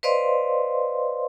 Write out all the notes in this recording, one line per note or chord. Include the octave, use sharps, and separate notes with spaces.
B4 C5 D5 D#5 F5 C6